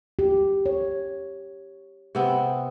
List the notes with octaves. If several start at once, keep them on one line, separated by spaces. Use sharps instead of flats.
G4
C#5
C3 B3 C4